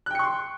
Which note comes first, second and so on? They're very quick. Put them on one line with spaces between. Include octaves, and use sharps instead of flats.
F#6 G5 C#7 C#6 C6